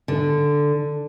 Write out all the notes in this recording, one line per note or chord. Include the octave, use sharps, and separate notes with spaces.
D3